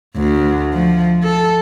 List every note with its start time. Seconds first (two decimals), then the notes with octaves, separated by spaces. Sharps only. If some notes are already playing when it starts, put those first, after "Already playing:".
0.16 D2
0.73 F3
1.23 A4